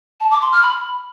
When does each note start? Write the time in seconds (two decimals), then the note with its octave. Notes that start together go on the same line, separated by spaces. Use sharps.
0.20 A5
0.31 D6
0.41 C6
0.52 F6
0.63 B5